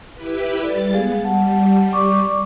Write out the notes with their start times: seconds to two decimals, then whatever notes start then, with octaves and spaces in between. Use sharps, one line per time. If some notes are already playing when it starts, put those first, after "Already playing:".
0.14 E4 G4 B4
0.63 G3 A4 B4 D5 A6
0.94 G#3 B3 G#4 F5
1.24 G3 F#5 A5
1.93 D5 C#6 D6